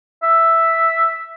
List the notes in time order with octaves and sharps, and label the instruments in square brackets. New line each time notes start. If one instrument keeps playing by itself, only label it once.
[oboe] E5